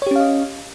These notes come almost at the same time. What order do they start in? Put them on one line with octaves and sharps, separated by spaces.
C#5 G4 C#4 F5 D#5